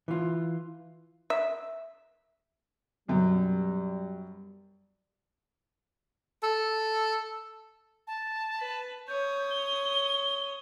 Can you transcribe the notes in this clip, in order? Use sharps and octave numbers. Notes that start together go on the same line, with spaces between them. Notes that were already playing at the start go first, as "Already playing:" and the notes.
E3 F4
E5
F#2 B2 G3
A4
A5
B4
C#5 D#6 G6
G7